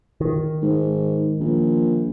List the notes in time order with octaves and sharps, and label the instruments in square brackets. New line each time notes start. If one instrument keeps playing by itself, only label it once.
[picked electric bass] D#3
[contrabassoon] G#2
A#1